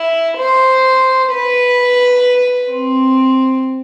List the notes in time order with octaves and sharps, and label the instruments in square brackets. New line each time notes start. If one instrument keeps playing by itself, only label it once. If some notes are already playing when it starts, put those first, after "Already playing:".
Already playing: [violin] E4
C5
B4
C4